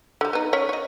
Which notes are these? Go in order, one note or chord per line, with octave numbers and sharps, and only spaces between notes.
D3 G3
B3 D#4
C#4 C#5
C#5 D#5